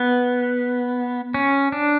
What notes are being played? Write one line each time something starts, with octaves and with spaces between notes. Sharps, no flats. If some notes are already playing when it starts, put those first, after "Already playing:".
Already playing: B3
C#4
D4